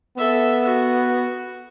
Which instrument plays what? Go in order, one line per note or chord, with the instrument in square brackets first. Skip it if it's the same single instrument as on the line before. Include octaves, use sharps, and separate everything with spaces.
[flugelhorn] B3 [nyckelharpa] A4 E5
[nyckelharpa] F#4